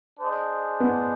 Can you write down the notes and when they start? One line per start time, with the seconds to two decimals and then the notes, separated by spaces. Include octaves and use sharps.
0.20 D4 G#4 C5 D#5
0.80 B3